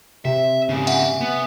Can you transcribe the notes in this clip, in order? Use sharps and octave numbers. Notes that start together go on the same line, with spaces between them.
C3 E5
G#2 C#3
E5 F#5 G#5
B3